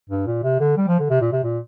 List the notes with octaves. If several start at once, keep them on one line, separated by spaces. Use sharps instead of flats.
G2
A#2
C3
D3
G3
F3
D3
C3
A#2
C3
A#2